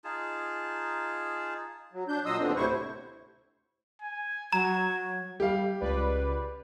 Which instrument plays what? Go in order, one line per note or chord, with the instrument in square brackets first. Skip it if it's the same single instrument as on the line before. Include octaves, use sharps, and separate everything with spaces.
[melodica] D#4 F4 G#4 A5
[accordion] F#3
D4 G6
A#2 F#3 D#5 C6 D#6 E6
D#2 D3 B3 C4 D4
D2 A2 C3 E4 C5 C#6
[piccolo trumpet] G#5
[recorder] F#3 [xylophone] A#5 [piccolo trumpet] G#6
[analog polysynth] G3 [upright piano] G4 F5
[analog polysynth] C#2 B4 D5